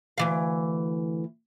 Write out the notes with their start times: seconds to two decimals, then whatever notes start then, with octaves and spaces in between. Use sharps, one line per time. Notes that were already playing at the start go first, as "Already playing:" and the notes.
0.18 D2 E3 F5